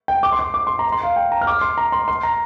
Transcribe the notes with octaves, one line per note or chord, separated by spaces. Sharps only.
G5
D6
C6
D6
D6
C6
A#5
C6
F5
G5
A#5
F6
D6
C6
A#5
C6
C6
A#5